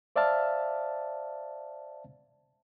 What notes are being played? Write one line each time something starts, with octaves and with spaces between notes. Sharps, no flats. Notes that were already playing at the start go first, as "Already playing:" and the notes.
C5 D5 E5 F5 A5 F6